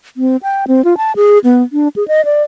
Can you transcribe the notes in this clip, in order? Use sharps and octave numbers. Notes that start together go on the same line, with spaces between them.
C4
G5
C4
F4
A5
G#4
B3
D4
G#4
D#5
D5